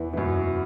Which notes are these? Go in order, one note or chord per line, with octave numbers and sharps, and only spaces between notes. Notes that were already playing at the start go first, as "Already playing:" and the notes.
Already playing: E2 E3
E3
F#2 F#3